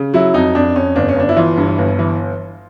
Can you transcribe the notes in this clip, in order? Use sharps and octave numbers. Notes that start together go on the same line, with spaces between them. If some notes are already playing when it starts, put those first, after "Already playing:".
Already playing: C#3
F#3 E4
F2 D#4
F2 D4
F2 C#4
G1 D4
C#4
G1 D4
E4
E3 F4
G2
G1
E3